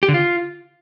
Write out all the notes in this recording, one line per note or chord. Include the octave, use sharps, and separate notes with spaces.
G4
D3
F4